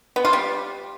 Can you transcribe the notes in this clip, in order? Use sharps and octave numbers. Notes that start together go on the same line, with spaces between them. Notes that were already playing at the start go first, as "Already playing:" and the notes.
B3
F4
G3